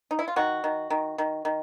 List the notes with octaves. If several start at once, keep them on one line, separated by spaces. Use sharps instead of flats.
D#4
E4
F4
D#3 F#4
D#3
D#3
D#3
D#3